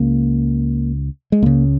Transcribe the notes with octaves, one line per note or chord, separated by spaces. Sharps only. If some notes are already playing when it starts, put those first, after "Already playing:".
Already playing: C#2 C#3 A#3
G#3
C#2 C#3 A#3